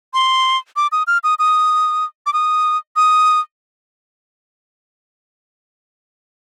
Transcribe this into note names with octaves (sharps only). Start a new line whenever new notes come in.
C6
D6
D#6
F6
D#6
D#6
D6
D#6
D#6